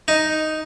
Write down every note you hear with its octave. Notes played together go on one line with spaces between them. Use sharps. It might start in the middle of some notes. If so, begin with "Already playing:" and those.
D#4